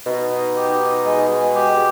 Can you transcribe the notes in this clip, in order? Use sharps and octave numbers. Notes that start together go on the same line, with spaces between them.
B2 D#4
D#4
G4
D#4
G#3
G#3
G4